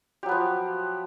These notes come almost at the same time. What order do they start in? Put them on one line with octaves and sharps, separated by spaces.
G4 F#3 B3 F3